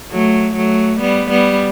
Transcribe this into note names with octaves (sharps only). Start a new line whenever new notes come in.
F#3 A3
F#3 A3
G3 B3
G3 B3